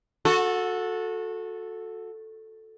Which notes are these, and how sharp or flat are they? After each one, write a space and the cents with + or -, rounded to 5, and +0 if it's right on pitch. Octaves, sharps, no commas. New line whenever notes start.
F#4 -25 A4 +0